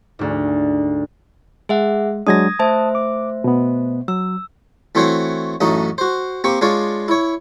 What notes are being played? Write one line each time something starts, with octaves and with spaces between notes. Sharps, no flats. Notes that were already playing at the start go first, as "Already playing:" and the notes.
D2 G#2
G#3 G#4 E5 F#5
F#3 G#3 D4 D#6 G#6 A#6
A3 C5 E5 A5 D#6
D6
B2 B3
F#3 E6
E3 A3 C4 F#4 C5 C#5
A1 F#2 A3 D#4 D#6
F#4 C5
A#3 C4 G4 C#6
G#3 D4 F4 C#5 D5 F5
E4 C#5